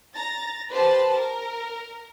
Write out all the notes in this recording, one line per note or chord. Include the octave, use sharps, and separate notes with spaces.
A#5 A6 A#6
G4 B4 C5 A5
A#4